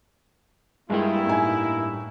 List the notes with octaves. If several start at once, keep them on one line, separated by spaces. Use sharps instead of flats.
G2 G3 G#3 A#3 E4 F4 G#4 G5
A2 D#4 G#5